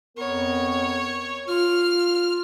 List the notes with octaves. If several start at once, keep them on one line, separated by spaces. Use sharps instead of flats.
F2 B3 A#4 C#5
F4 F6